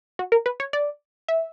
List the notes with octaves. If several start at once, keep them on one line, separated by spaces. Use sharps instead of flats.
F#4
A#4
B4
C#5
D5
E5